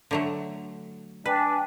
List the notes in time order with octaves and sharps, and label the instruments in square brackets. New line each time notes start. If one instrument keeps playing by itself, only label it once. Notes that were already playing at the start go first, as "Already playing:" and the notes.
[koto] D3 F#3 A3
[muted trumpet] D4 [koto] B4 [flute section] G5 G#5